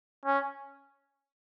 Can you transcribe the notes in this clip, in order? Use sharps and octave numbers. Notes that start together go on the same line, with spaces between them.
C#4